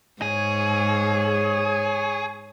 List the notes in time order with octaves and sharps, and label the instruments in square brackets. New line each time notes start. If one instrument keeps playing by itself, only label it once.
[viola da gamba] G#2 [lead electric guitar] G#4 [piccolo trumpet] C#5